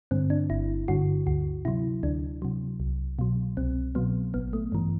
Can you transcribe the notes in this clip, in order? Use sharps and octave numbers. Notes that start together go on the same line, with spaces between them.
G2 D3 C4
D4
G1 E4
G2 D3 F#4
D2 F#4
C3 F#3 E4
D2 D4
C3 F#3
C2
B2 F#3
C2 C4
B2 F#3 B3
A1 B3
A3
G2 E3